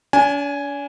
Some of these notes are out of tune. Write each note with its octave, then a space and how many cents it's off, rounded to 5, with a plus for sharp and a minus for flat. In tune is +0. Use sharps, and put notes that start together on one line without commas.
D4 -45 G#5 +0